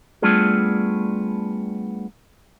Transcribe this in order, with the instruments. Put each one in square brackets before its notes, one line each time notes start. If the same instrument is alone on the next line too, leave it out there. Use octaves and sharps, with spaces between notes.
[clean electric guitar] G3 A3 B3 D4 F4 G#4